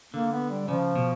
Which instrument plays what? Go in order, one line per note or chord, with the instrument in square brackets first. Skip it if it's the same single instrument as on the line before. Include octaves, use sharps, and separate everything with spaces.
[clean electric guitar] D3 [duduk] A#3
[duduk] B3
G3
[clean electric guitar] C#3 [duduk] F3
[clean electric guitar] B2